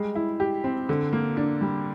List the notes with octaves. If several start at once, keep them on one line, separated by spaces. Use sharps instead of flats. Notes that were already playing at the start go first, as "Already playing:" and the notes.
Already playing: G3 G#3
E4
G4
C4
D3
A#3
D4
G3